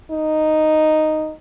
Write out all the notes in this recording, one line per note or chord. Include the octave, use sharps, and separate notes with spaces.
D#4